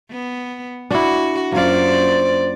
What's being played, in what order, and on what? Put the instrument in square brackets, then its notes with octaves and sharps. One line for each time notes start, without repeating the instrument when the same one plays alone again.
[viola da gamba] B3
[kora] D4 E4 [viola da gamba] F#4
[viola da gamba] F#2 D5 [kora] A#3 F4 [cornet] C5